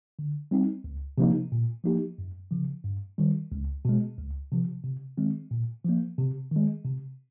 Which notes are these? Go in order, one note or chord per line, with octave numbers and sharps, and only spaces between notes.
D3
G3 C4 D#4
C#2
C3 F3 A#3 D#4
A#2
F3 A#3 D#4 G4
F#2
C#3 F3
G2
D#3 G3
C#2
B2 G#3
C#2
C3 F3
C3
D#3 G#3 C4
A#2
F3 A#3
C3
D#3 G#3
C3